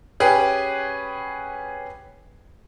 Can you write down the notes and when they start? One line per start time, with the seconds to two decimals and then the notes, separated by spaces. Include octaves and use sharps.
0.20 C#4 G4 G#4 B4 F#5 G5